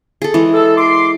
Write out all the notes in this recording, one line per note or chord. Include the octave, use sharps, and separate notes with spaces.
G#4 A4
E3 G#3
A4
C6 D6